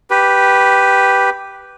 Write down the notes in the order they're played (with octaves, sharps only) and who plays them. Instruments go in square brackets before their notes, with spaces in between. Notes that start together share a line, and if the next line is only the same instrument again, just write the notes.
[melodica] G4 B4